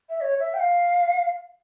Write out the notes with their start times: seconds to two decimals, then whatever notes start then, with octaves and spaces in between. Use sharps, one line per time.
0.09 E5
0.21 C#5
0.40 E5
0.54 G5
0.59 F5